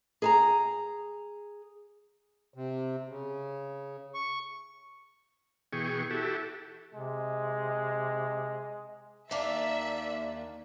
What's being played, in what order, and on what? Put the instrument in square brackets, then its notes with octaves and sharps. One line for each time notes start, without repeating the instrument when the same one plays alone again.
[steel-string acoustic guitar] G#4 A5 A#5
[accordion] C3
C#3
C#6
[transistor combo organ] B2 E3 G#4 G5 C#6
E4 F#4 G4 A4
[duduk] C3 [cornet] G#3
[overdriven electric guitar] D#2 [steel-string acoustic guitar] A#3 D4 [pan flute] D5 [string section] E5